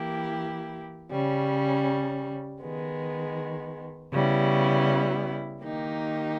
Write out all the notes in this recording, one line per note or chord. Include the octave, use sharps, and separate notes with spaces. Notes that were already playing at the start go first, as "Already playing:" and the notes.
Already playing: E3 A#3 E4 G4
C#3 G3 C#4
D#3 G#3 B3
C#3 G3 B3 E4
D#3 A#3 D#4 G4